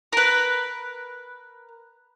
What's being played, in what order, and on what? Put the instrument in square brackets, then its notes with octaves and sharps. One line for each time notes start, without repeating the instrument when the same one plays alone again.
[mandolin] A#4 B4